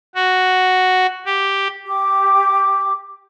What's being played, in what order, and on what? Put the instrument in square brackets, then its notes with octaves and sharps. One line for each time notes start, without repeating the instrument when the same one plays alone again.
[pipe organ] F#4
G4
[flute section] G4 D6